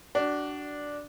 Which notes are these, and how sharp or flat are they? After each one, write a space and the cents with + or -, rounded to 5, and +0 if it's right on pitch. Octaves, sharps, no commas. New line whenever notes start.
D4 +0 F#4 +30